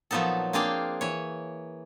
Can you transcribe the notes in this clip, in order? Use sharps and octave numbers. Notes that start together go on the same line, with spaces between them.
A#2 F3 F#3 B3 D#4 A4
A#3 C4 D4 G#4 F5 G5
E3 C#5